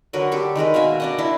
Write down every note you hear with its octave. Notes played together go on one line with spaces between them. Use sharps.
D3 F#3 A#4 B4
G4 A4
D#3 G#3 A#4 B4
B2 A#3 E5 G#5
D4 D5 D#5
D4 E4 C5